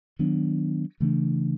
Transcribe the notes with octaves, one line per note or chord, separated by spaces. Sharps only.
D#3 F#3 B3 D4
C#3 E3 A3 D4